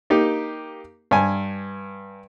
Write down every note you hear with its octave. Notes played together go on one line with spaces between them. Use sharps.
A#3 D#4 G4
G2 G#5